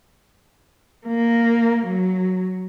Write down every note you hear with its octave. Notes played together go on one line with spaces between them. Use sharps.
A#3
F#3